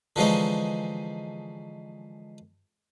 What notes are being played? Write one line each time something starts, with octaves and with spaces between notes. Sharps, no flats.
D3 E3 F3 G#3 C#4 D#4